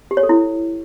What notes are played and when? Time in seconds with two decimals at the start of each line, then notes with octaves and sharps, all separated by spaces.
0.11 G4
0.17 C#5
0.23 A4
0.29 E4